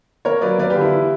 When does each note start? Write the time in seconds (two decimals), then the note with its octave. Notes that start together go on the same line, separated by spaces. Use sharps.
0.25 A#3 A#4 C#5
0.41 F#3 B4 D5
0.58 A#3 B4 D5
0.70 G4 B4
0.75 D3
0.81 E4 G4
0.93 E3